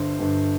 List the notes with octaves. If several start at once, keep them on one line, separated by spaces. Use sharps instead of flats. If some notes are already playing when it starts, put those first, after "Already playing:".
Already playing: G1 G2 D3 C5
G1 G2 D3